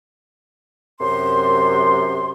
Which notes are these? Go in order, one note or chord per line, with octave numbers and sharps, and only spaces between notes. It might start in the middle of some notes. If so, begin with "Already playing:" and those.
F#2 C3 C6